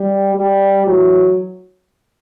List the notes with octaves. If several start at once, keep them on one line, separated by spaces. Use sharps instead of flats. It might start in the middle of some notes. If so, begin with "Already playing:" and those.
Already playing: G3
G3
A2 E3 F#3